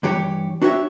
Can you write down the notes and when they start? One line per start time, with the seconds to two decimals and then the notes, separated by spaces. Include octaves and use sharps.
0.03 G2 E3 G4 C#5
0.62 D4 F#4 G4 B4 C#5 E5